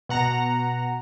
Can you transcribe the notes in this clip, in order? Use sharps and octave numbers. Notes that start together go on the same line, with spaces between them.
B2 F#5 A#5